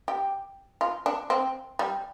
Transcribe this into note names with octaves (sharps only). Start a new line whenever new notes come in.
G4
F4
D4
C4
G3